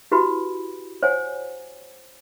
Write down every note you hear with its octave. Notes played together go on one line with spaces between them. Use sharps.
E4 F#4 G4 B4 B5
C5 C#5 F#5 G#5